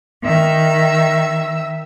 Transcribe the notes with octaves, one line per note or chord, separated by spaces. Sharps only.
D#3 E5 E6